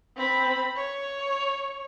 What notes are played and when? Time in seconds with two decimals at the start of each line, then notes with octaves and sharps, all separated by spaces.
0.17 C4 B5
0.76 C#5